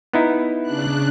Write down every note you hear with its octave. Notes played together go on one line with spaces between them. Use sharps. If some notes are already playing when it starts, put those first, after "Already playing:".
B3 D#4 E4
C#3 D4 F#6